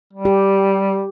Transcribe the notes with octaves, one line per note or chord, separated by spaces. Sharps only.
G3
G4